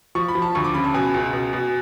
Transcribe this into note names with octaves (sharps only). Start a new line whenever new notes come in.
F3 C#6
B5
F3
A5
D2 C#6
D6
C#3 B5
A5
B2 G#5
C#2
B2
B2